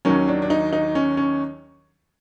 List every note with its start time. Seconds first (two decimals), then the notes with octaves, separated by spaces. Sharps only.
0.05 D#2 D#3 F#3 C#4
0.28 D4
0.42 D4
0.50 D#4
0.73 D#4
0.95 C#4
1.17 C#4